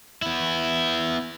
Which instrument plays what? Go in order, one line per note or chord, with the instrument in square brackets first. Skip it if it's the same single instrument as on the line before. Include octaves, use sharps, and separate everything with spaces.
[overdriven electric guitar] B3 E4